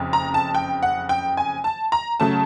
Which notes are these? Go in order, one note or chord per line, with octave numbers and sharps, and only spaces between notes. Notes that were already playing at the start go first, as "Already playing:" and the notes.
Already playing: F#1 F2 C#3
A#5
A5
G5
F#5
G5
G#5
A5
A#5
C#3 F#3 A3 A5